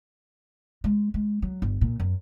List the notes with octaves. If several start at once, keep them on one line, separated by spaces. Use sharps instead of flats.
G#3
G#3
F#3
G1
A#2
F#2